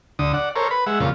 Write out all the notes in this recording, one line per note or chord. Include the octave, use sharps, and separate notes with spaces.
D2 D3 D#6
D5 F#5
A4 A#4 C5 C#5
B4 B5
G#3 E5 F#5
F2 A#2 C#3 F4